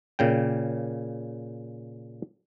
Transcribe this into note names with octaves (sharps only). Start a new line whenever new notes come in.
A#2 C#3 G5